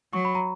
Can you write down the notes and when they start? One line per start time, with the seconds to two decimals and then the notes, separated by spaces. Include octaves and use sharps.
0.13 F#3 C#6
0.25 B5
0.35 A#5